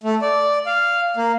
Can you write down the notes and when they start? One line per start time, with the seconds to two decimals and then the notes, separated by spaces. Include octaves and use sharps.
0.04 A3
0.22 D5
0.66 F5
1.17 A#3